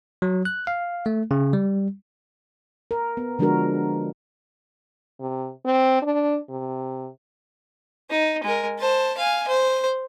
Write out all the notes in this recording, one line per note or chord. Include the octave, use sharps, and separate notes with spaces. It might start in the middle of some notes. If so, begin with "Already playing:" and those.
F#3
F#6
F5
A3
C#3
G3
A#4
B3
D3 F3 G#3 D4 F#4 A#4
C3
C4
D4
C3
D#4
G#3 A#4
C5 A5
F5 G#5
C5